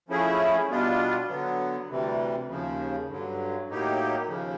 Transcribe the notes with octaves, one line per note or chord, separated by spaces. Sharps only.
F3 A3 C#4 E4 G#4
B2 G3 B3 D4 F4
D3 F#3 B3
D2 C3 E3 G3
D#2 C#3 F3
G2 D3 F#3
A2 F#3 A#3 D#4 G4
D#2 C#3 F3